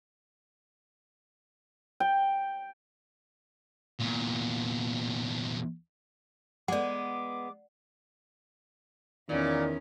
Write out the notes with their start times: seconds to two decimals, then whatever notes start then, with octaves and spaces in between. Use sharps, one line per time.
2.00 G5
3.99 E2 A#2
6.68 G#3 B3 D5 F#5 D6
9.29 E2 A#2 D#3 C#4